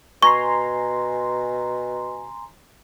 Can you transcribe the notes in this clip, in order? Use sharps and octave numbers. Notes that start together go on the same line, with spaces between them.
B2 G#5 A#5 C6 C#6